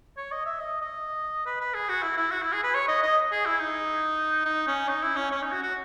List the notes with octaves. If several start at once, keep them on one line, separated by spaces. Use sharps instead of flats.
C#5
D#5
E5
D#5
D#5
B4
B4
G#4
F#4
E4
E4
F#4
E4
G#4
B4
C#5
D#5
D#5
G#4
E4
D#4
D#4
C#4
D#4
E4
C#4
C#4
D#4
F#4
F#4